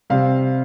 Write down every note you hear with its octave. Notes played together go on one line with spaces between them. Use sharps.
C3 G3 C4 F5